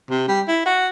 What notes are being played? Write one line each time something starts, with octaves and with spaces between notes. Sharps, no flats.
C3
G3
E4
F#4